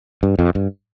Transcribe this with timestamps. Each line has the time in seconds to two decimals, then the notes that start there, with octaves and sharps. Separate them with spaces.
0.23 G2
0.39 F2
0.55 G2